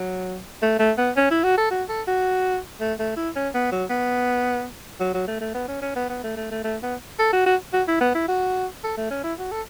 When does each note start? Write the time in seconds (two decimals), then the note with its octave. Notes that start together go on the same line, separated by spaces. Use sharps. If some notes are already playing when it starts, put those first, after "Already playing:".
Already playing: F#3
0.62 A3
0.79 A3
0.98 B3
1.16 C#4
1.31 E4
1.44 F#4
1.57 A4
1.71 F#4
1.89 A4
2.08 F#4
2.81 A3
2.99 A3
3.17 E4
3.36 C#4
3.54 B3
3.72 F#3
3.90 B3
5.00 F#3
5.14 F#3
5.27 A3
5.41 A3
5.54 B3
5.68 C#4
5.82 C#4
5.96 B3
6.09 B3
6.23 A3
6.37 A3
6.51 A3
6.64 A3
6.83 B3
7.19 A4
7.33 F#4
7.46 F#4
7.73 F#4
7.88 E4
8.01 B3
8.15 E4
8.28 F#4
8.84 A4
8.97 A3
9.11 C#4
9.24 E4
9.39 F#4
9.52 A4